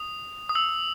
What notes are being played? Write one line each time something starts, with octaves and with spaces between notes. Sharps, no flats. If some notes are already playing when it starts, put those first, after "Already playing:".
Already playing: D#6
D#6
E6